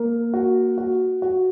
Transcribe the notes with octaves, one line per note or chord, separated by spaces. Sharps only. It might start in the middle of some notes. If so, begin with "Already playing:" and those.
Already playing: A#3
F#4
F#4
F#4